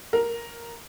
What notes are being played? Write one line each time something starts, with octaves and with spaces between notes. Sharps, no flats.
A#4